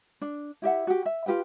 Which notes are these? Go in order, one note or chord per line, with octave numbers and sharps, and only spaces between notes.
D4
E4 G4 E5 F#5
F#4 G4
E5
F4 G4 B4 G5